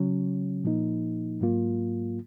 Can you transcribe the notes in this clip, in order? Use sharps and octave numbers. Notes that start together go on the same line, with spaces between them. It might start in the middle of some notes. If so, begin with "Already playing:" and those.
Already playing: C#3 F#3 C#4
A#2 F3 A#3 D#4
G#2 F#3 A#3 F4